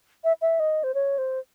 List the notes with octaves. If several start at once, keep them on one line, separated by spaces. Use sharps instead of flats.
E5
E5
D#5
C5
C#5
C5